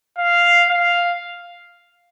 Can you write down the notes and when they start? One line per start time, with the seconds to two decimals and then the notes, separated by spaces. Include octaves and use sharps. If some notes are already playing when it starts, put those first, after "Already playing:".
0.18 F5
0.70 F5